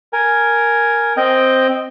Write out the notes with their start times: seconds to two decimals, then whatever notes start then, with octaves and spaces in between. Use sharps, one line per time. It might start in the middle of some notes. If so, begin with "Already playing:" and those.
0.13 A#4 G#5
1.17 C4 D#5 G5